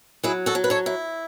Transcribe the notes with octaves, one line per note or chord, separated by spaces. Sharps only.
F#3 E4 G#4
F#4 A4
F#3
B4
A4 C#5
E4